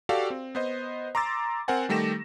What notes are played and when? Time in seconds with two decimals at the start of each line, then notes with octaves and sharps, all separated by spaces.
0.09 F#4 G4 A4 D5 F5
0.30 C4
0.55 B3 C5 D#5
1.15 A#5 C6 D6 E6 A6
1.68 C4 A#4 C5 F#5 G#5
1.89 D#3 G3 A3 G4 A#6 E7